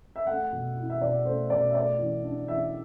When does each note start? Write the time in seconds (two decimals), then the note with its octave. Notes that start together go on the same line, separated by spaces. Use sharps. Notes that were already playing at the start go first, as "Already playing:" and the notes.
0.16 E5
0.27 A3 F#5
0.52 B2
0.77 E4
0.90 E5
1.01 B2 D5
1.25 A3 C5
1.50 B2 D5
1.70 E5
1.74 A3 D5
1.99 E3
2.24 D4
2.48 E3 E5